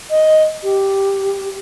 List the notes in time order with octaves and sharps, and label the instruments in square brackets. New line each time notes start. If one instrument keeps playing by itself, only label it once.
[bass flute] D#5
G4